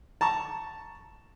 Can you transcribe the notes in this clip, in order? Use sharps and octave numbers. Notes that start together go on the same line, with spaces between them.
A5 A#5 C#6